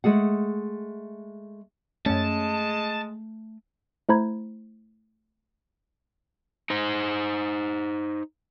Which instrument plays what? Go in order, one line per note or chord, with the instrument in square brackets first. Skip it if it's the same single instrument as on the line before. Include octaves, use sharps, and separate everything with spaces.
[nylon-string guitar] G#3 A3 G#4 F#5
[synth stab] F#2 C#4 [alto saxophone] G#3 [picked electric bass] A3 [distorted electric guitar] A5
[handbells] A3 E4 C5 A#5 B5 G#6
[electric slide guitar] D#4 C5